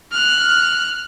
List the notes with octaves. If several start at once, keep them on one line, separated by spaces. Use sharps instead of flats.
F6 F#6